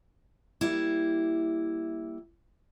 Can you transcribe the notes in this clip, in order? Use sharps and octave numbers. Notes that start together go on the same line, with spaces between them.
G3 A#3 E4